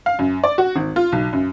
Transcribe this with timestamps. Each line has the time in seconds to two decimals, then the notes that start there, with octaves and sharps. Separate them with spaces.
0.06 F5
0.19 F#2
0.44 D5
0.58 F#4
0.76 G#1
0.96 F4
1.12 B1
1.33 F#2